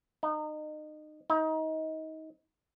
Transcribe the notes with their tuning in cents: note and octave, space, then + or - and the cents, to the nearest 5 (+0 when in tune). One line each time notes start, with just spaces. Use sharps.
D#4 -30
D#4 +25